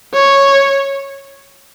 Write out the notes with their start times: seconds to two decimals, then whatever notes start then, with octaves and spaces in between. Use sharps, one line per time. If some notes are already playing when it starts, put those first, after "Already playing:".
0.14 C#5